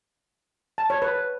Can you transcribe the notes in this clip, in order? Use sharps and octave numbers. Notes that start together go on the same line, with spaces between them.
A5
C#5
B4